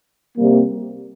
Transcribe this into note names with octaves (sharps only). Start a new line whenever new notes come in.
C3 G3 A#3